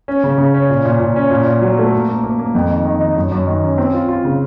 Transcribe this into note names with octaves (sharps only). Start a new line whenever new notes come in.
C#4
C#3
C#3
C#4
A#2
A#2
A#2
C#4
A#2
A#2
F#3
A3
A#3
A#3
A#3
A#3
F2
D#3
D#3
D#4
F#2
F#2
D#3
C#4
C4
F4
F4
C#3